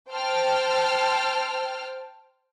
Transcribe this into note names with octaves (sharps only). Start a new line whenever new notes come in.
C5 G5 A5 F6